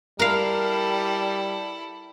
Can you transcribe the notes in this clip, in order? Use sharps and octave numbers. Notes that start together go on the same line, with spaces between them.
G3 E4 A4 A#4 F5